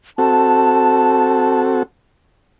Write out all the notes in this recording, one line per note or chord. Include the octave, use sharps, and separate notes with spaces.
C4 F#4 A4 A5